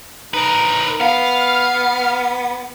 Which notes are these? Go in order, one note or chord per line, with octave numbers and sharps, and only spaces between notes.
D#4 A#4 B4
B3 F5